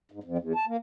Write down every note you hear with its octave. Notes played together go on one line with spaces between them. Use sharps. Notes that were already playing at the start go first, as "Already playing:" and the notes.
G#2
F2
E2
A5
A#3